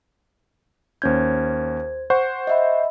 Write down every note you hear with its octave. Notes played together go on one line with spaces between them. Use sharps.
D#2 C#4 C5 G6 G#6
C5 F#5 C#6
D#5 E5 B5